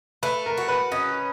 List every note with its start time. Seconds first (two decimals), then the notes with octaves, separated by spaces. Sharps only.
0.23 A3 B4
0.46 A#4
0.57 F#4
0.68 B4
0.92 C#4 D#5